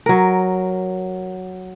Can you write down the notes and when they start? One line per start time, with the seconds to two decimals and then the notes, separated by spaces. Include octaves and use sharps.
0.06 F#3 A#4